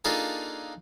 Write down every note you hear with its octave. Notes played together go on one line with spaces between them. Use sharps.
A#3 D4 D#4 F4 G#4 A4